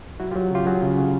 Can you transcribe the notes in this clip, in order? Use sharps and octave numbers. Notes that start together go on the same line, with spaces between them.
F#3 E4 F#4
F4 G4
F#3
C#3 F4 G4
F#3 F#4 G#4
C#3
C#3